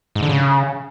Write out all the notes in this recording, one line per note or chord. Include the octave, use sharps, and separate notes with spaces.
G#2
D3
C#3